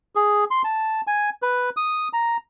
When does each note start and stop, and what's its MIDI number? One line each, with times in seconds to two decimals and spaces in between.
0.15 0.44 68
0.51 0.62 84
0.64 1.01 81
1.07 1.30 80
1.42 1.70 71
1.77 2.08 87
2.13 2.37 82